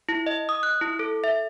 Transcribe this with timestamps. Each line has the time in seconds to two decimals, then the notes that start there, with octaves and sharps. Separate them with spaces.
0.09 E4
0.26 D#5
0.49 D#6
0.63 F#6
0.81 E4
0.99 A4
1.24 E5